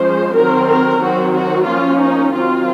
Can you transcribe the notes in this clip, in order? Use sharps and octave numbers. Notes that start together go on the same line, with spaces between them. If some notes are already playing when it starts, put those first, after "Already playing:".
Already playing: F3 G#3 C#4 C5
D#3 F#3 C4 A#4
A#4
D#3 F#3 C4 F#4
F#4
F3 A#3 C#4 F4
D#4
D#3 F#3 C4 F4